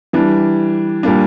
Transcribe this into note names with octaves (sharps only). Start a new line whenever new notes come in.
E3 G3 D4
A#2 G3 A#3 D4